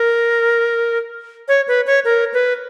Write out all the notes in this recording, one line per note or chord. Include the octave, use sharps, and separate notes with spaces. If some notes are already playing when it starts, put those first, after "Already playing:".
Already playing: A#4
C#5
B4
C#5
A#4
B4